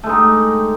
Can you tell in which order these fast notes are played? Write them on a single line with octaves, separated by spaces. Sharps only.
A3 G#3 D#4 G4